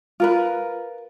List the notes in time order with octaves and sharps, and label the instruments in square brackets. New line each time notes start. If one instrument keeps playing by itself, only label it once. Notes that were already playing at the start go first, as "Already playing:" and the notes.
[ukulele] F4 A#4 B4